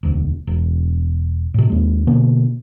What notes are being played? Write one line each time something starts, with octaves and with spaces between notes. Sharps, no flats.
E1 D2
E1
A2 C3
D#2 G#3
B2 D3 A#3